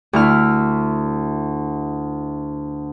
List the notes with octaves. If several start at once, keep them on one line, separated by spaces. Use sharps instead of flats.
D2 E4 F6